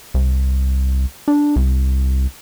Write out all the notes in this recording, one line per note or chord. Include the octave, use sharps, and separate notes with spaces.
C2
D4
C2